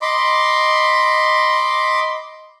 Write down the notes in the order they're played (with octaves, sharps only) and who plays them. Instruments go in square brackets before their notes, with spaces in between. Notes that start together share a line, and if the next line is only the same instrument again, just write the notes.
[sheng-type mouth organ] D#5 B5 C6 D6